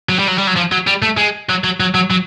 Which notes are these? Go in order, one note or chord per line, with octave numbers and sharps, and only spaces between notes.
F#3
G3
F#3
G3
F#3
F3
F#3
G3
A3
G#3
F#3
F#3
F#3
F#3
F#3